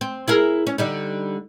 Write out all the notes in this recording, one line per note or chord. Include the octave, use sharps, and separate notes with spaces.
C4
E4 G#4 A#4
C#4
D3 G3 D#4